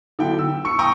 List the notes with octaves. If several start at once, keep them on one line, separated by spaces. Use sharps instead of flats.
D3 F#3 E4 G5
E6
C#6 C#7
G5 A#5 C#6 D#6